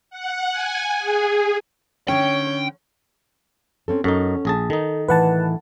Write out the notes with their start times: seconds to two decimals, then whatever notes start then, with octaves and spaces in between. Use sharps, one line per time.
0.10 F#5
0.52 G#5
0.99 G#4
2.08 D3 C#4 C#5 G5
3.88 C4 C#4 A4
4.04 F#2 C#4 D#4 A4 F#5
4.45 A#1 G#4 A5
4.70 D#3 D#4 A4
5.08 A2 E3 B4 F#5 A5